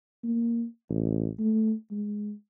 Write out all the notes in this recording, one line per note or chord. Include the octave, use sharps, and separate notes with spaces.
A#3
A1
A3
G#3